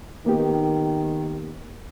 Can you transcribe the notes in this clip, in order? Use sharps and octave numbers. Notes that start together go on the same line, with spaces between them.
D#3 A#3 B3 G4